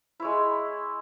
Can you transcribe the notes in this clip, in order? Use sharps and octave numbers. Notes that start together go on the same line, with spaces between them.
G#3 E4 C#5